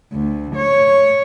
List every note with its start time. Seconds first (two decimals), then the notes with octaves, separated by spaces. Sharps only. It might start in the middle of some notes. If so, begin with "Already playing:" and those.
0.13 D2
0.56 C#5